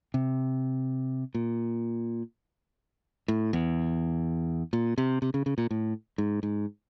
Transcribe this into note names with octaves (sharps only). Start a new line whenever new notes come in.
C3
A#2
A2
E2
A#2
C3
C3
C#3
C#3
A#2
A2
G#2
G#2